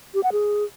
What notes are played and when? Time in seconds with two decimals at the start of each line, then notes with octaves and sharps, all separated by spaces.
0.14 G4
0.23 F#5
0.32 G#4